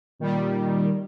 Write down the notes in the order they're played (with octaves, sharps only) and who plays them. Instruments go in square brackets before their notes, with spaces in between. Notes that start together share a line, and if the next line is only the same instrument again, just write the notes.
[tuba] A#2 [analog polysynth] D#3 G3